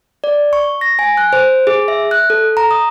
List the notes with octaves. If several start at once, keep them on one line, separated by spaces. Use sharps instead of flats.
D5
C#6
A#6
G#5
F#6
C5
G#4
E5
F#6
A4
A#5
D#6